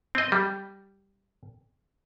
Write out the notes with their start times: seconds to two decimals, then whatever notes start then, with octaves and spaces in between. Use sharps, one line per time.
0.15 C4 D#5
0.32 G3